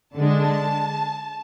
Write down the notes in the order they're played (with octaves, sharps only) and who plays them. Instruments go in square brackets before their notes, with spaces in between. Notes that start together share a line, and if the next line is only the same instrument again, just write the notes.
[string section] D3 G#3 D4 A5